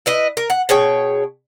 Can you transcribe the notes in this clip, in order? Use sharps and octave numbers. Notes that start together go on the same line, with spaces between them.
E4 B4 D#5
A#4
F#5
B2 G#4 C#5 G5